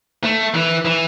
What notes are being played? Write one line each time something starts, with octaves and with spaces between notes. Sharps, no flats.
A3
E3
E3